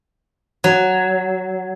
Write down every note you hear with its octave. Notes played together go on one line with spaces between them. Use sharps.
F#3